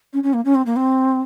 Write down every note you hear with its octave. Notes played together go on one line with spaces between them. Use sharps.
C#4
C#4
A#3
C#4
C4
A#3
C4